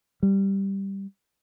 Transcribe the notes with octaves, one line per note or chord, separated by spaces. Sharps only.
G3